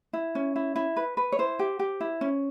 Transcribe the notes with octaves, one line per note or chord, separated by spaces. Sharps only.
E4
C#4
E4
E4
B4
B4
C#5
E4 C5
G4
G4
E4
C#4